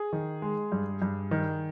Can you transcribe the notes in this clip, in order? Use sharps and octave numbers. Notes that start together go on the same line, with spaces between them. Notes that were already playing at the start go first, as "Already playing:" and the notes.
Already playing: G#4
D#3
G#3
G2
G2
D#3